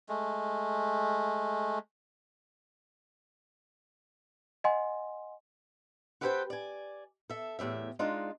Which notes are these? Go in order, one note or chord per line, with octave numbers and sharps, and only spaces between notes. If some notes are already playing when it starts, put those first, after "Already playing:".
G#3 A3
D#5 F#5 G#5 C6
F#4 G4 A4 B4 C5 G5
D5 G#5
A4 E5
E2 A2 G4 E5
G#3 D4 D#4 F4